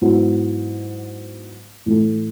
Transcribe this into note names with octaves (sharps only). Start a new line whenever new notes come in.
G#2 F#3 B3 E4
A2 E3 A3 E4